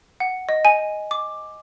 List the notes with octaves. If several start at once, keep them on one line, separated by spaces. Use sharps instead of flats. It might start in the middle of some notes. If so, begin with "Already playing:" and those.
F#5
D#5
G#5
D6